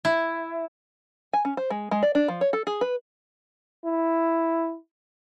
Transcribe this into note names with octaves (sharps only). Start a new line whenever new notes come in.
E4
G#5
C#4
C5
G#3
G#3
D5
D4
F3
C#5
A4
G#4
B4
E4